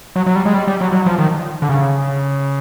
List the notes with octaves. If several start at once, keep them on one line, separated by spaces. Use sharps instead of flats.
F#3
F#3
G3
G#3
G3
G3
F#3
F#3
F3
D#3
D3
C#3